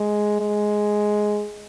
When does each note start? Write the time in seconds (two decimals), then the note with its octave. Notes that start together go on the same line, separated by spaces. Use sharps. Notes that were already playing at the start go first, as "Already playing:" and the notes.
Already playing: G#3
0.41 G#3